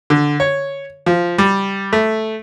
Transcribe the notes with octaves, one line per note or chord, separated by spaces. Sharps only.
D3
C#5
F3
G3
A3